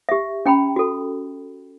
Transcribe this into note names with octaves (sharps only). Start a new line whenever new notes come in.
G4 E5
C#4 G5 A#5 B5
F#4 A4